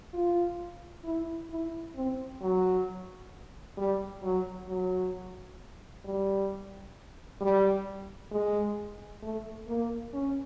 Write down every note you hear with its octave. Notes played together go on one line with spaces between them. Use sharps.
F4
E4
E4
C4
F#3
G3
F#3
F#3
G3
G3
G#3
A3
A#3
C#4